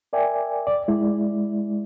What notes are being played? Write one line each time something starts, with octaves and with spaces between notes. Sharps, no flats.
A#4 D5 E5 G5 G#5
D5
G#3 E4 D5